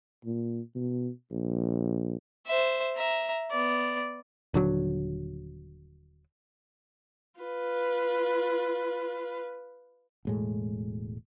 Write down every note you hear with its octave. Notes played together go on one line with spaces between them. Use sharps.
A#2
B2
A#1
C5 E5
E5 A#5
B3 D5
D#1 D3 F#3
F4 B4
E1 A2 G#3